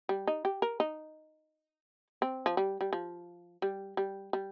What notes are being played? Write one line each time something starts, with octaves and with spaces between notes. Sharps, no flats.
G3
D#4
G4
A#4
D#4
C4
F3
G3
G3
F3
G3
G3
G3